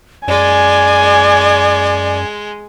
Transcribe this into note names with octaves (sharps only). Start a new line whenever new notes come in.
F#2 G#3 D5 G#5